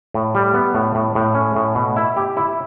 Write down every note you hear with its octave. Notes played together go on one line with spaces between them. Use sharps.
A2
G3
B3
A2
A2
A2
C#4
A2
B2
E4
G4
E4